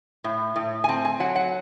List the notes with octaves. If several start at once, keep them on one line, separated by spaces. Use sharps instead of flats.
A2
A2
G#5
C4 A5
G#5
F#3 F#5
F#5